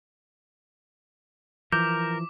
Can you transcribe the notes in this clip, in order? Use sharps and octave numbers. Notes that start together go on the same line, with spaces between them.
E3 F3 A#4 D6 G6